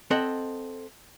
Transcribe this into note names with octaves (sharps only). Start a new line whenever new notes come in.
C4 A4 D#5 F#5